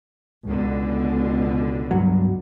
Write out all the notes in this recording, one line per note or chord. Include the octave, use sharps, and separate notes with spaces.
C#2 B2 D3
G2 F#3